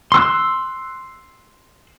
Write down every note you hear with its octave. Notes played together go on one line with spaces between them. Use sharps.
C6 E6 F#6